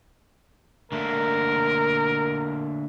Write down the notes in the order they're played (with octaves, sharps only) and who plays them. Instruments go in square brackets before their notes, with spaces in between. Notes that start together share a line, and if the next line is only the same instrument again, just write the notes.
[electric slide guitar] D3 A3 A#3 [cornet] A#4